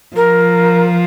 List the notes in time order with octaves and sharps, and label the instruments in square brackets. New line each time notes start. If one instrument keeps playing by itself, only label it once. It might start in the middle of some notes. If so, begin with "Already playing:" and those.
[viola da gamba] F3 [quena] A#4